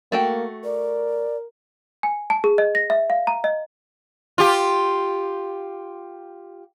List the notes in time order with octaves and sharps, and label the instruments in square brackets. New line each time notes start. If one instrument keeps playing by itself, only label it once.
[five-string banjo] A3 F#4 G5 [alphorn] A#3
[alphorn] A#4 [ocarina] D5
[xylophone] G#5
A5
G#4
D#5
A#6
E5
F5
A#5
D#5
[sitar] F4 G4